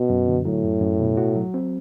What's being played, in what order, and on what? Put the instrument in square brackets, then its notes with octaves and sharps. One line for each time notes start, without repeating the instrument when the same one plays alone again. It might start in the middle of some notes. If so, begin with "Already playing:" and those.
Already playing: [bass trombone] B2
[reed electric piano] F#2
D3
[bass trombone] A2 [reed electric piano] F#3
[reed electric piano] F#2
F#2
B2
F#4
F#3
C4